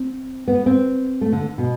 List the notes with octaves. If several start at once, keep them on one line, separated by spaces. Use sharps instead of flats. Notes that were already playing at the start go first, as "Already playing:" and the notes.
Already playing: C4
B3
C4
A3
D3
B2